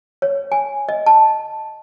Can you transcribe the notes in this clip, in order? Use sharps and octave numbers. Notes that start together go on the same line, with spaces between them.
C#5
G#5
D#5
A5